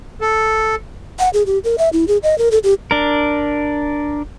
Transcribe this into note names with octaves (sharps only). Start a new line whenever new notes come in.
A4
F#5
G#4
G4
A#4
E5
E4
G#4
D#5
A#4
A4
G4
D4 A#4